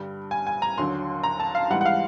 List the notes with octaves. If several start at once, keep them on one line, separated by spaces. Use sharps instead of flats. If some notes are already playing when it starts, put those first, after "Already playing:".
Already playing: G2 D3 G3
G#5
G#5
A#5
D#2 D3 F#3 C6
A#5
A5
F5
G#2 E3 G3 F#5
F#5
F5